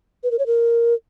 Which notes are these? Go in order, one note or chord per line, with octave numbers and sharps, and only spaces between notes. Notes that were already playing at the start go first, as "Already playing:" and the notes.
B4
A#4
C#5
A#4